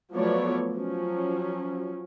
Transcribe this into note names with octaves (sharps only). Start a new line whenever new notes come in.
F3 F#3 A3 B3 C#5 D5
F3 F#3 C#4